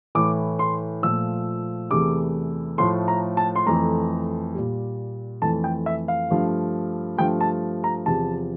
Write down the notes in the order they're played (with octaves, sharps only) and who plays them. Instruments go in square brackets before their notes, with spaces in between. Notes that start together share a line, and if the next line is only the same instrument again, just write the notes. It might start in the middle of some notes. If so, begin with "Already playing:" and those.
[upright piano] A2 E3 A3 D6
C6
A#2 F3 A3 E6
E2 C3 E3 A3 D6
A2 F3 A3 C6
A#5
A5
C6
F2 E3 A3 A#5
A#2 G3
F2 E3 A3 A5
G5
E5
F5
G2 F3 A3
G2 F3 A3 G5
A5
A#5
E2 C3 F3 A5